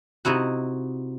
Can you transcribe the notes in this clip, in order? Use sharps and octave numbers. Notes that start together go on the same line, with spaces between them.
C3 D#4 E4 F#4